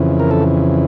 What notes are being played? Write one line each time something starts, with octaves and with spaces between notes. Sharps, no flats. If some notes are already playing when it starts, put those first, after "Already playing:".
Already playing: F2 C#3 E3
A#4
A4